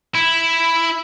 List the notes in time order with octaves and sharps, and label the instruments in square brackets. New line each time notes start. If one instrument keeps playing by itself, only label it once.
[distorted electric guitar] E4